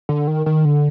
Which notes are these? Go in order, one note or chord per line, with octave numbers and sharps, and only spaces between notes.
D3
D#3
D#3
D3